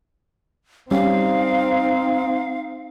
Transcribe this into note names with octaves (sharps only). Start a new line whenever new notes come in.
G3 C4 C#4 D#4 G4 F5